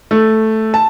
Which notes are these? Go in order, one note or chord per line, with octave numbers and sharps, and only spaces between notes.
A3
A5